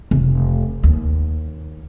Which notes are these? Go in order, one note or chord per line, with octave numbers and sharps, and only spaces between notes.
F1
D#2